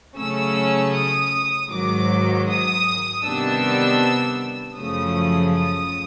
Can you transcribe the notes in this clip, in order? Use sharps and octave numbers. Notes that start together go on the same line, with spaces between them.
C#3 F#3 A3 C#4 E6
D#6
G#2 D#3 F#3 D6
D#6
C3 D#3 G3 B3 D4 E6
F#2 C#3 F3 A3 D#6
D#6